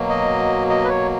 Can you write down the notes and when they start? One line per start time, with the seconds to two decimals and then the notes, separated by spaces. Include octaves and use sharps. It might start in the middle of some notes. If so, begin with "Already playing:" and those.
Already playing: B2 F#3 A#3
0.09 D#5
0.70 D#5
0.84 B4
0.89 C#5